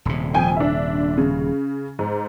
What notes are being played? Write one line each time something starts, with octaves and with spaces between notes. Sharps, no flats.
D#1 C3
F2 G5 G#5
D4 E5
C#3
G#2